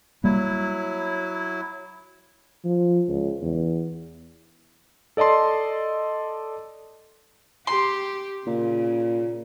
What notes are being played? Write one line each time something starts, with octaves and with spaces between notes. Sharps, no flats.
F#3 G3 A#3 E4
F3
C#2
E2
A4 D5 D#5 A5 C6
G4 C6
A#2 C#3